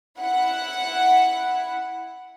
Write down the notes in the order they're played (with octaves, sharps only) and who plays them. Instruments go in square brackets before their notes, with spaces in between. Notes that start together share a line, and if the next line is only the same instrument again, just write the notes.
[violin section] E4 F#5